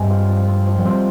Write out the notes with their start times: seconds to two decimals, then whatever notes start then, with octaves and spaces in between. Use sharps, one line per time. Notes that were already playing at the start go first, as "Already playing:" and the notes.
Already playing: G2 C3 G3 G#3
0.10 F4
0.28 F3
0.47 C4
0.67 F3
0.79 F#3
0.85 G3 C4